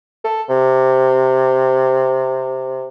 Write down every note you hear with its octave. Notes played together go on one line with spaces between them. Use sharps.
A4
C3